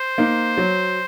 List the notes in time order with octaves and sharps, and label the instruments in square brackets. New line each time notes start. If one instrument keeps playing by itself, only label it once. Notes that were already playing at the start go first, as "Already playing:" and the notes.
Already playing: [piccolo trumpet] C5
[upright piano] A#3 D#4
F#3